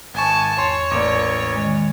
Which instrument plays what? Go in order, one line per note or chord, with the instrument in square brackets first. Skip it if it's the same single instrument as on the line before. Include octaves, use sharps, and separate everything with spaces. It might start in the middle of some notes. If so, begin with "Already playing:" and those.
[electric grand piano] G#1 C#6 [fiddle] G#5 A5
[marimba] E2 [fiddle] C#5 [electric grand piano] C6
[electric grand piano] A1 A#3 [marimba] D5 D6
[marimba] D#3 G#3